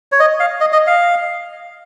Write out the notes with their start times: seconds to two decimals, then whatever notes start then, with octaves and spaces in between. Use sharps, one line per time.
0.12 C#5
0.20 D#5
0.40 F5
0.61 D#5
0.73 D#5
0.87 F5